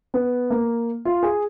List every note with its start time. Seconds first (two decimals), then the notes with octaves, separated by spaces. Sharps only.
0.14 B3
0.50 A#3
1.05 F4
1.23 G#4